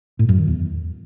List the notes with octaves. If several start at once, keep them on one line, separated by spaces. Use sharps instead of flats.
A2
F#2
D#3
E2